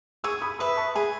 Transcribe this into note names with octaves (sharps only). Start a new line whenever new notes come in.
G#4 C#6 E6
B5 D#6
B4 E5 B5 D#6
A5 C#6
G#4 G#5 B5